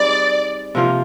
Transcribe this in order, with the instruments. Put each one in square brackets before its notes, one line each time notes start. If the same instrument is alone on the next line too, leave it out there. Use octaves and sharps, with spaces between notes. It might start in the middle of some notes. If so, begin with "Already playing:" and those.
Already playing: [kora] G3 C4 D#4 G#4 [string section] D5
[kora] C3 F3 A#3 F4